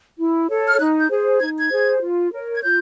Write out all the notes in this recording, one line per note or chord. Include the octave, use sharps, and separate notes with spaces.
E4
A4 C#5
F6
D#4 F#6
G6
G#4 C5
D#4 G#6
G#6
G#4 C5
F4
A#4 C#5
G#6
F4 G6